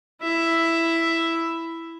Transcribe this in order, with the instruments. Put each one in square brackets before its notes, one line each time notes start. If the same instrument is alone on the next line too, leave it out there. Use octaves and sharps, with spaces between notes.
[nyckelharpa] E4 E5